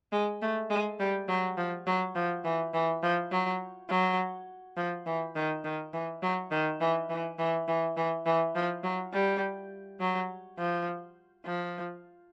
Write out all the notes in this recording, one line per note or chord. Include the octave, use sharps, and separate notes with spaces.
G#3
A3
G#3
G3
F#3
F3
F#3
F3
E3
E3
F3
F#3
F#3
F3
E3
D#3
D#3
E3
F#3
D#3
E3
E3
E3
E3
E3
E3
F3
F#3
G3
F#3
F3
F3